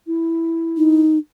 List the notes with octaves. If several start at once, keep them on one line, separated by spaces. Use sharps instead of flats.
E4
D#4